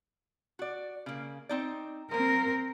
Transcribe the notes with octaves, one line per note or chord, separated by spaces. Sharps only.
F#4 D5
C#3 A#3
C4 D#4 D5
F3 A#3 C4 A#4